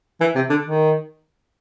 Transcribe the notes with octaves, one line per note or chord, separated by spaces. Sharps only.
E3
C3
D3
D#3